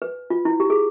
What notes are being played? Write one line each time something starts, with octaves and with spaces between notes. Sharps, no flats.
B4
F4
E4
G4
G#4